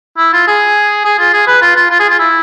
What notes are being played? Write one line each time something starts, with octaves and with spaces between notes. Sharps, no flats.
E4
F4
G#4
G#4
F4
G#4
B4
F4
F4
F4
G#4
F4
E4